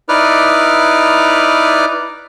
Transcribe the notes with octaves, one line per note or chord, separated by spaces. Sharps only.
D#4 E4 B4 D5 F6